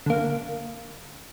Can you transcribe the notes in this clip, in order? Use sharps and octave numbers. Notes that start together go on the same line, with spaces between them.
D3 A#3